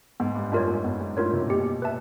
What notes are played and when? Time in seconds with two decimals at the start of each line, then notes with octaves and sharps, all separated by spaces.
0.20 G#2 B3
0.35 G2
0.52 F#2 D4 F4 A#4 C#5
0.68 F#2
0.84 G2 B3
1.00 G#2
1.17 A2 D4 F4 A#4 C#5
1.33 C3
1.41 B2
1.49 A#2 G4
1.56 B2
1.82 B4 E5 A5